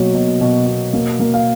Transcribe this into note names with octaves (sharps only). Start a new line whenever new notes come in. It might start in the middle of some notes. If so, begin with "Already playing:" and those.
Already playing: B2 F#3 A#3 C#5
B2
B2
B2
A#3
A#3
F5